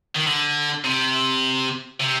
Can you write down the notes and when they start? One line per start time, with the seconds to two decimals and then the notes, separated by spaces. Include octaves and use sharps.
0.15 D#3
0.26 D3
0.84 C3
2.00 C3